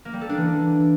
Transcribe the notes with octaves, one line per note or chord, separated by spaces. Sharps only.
A#3
G3
A4
D4
E3